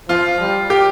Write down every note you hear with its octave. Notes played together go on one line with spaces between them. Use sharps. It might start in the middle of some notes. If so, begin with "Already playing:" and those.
F3 F4
G3
G4